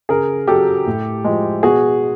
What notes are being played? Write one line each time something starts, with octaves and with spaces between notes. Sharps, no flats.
C#3 G#4 A#4
F#3 G4 A4
A2
F3 G#3
B2 F#4 G#4